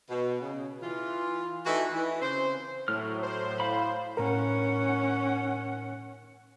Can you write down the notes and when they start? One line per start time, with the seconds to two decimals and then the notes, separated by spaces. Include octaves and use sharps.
0.10 B2
0.41 C#3
0.82 E3 F4
1.66 E3 A3 D#4 E4 F#4
1.93 E3
2.22 C#3 C4 C5
2.88 A2 F#3 F6
3.23 A2 C5
3.60 F5 B5
4.17 A2 C#4 A#4 F#5